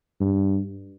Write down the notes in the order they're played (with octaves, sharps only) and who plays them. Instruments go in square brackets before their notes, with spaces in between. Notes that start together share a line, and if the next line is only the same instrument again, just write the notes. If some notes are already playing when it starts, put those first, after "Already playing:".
[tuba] G2